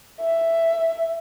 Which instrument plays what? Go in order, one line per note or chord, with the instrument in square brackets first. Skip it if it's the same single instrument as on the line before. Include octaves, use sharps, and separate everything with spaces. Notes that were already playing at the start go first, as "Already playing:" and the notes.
[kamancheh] E5